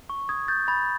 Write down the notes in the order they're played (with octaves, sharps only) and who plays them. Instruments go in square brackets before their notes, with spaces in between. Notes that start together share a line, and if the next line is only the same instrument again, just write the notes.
[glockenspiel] C#6
D#6 G#6
G6 A6
B5 A6